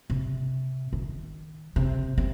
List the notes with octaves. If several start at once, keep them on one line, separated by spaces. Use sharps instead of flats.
C3
D#3
C3
C3